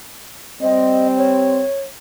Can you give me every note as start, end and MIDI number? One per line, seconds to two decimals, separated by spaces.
0.61 1.62 55
0.61 1.62 60
0.61 1.07 75
1.17 1.81 73